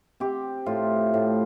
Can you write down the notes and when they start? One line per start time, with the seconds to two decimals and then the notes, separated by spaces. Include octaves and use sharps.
0.20 C4 G4
0.66 A2 F4
1.14 A2